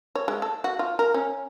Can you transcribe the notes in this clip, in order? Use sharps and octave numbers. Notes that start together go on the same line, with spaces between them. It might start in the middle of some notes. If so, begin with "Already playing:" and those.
C#5
G#3
A4
F#4
F4
A#4
C#4